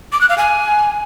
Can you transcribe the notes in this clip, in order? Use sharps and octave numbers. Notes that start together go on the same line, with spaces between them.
D6
F#6
F5
G#5